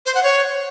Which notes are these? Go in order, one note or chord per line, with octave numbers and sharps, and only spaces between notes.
C5
F#5
C#5